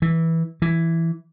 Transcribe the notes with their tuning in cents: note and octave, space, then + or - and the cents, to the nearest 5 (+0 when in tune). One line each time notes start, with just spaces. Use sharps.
E3 -10
E3 +5